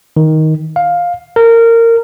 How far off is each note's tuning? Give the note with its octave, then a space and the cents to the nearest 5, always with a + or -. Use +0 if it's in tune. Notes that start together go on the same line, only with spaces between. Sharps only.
D#3 +10
F5 +10
A#4 -20